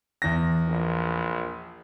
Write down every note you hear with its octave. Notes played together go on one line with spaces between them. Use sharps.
E2 A#6
A#1